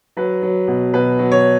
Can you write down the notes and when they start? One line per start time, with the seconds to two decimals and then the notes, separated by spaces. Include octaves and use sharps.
0.17 F#3 B4
0.42 F#3
0.68 B2
0.94 B2 B4
1.19 F#3
1.32 C#5